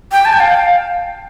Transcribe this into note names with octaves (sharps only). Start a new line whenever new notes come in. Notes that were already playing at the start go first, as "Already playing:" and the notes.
G5
A5
G5
F5